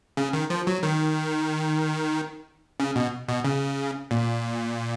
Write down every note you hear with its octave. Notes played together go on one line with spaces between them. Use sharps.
C#3
D#3
F3
F#3
D#3
C#3
B2
B2
C#3
A#2